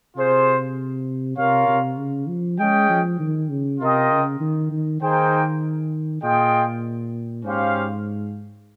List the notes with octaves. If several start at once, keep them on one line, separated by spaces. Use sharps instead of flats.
C3 F4 G#4 C5
C3 F4 A#4 C#5 F5
C3
C#3
F3
G#3 C#4 G#4 D#5 G5
F3
D#3
C#3
C3 F4 A#4 D#5 G5
C#3
D#3
D#3
D#3 A#3 D#4 G#4 C5 G5
A#2 F4 G#4 D#5 G5
G#2 C#4 G4 C5 F5